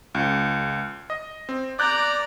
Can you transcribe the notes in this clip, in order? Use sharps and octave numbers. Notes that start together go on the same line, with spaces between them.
C#2
D#5
C4
D5 A#5 D6 F#6 G6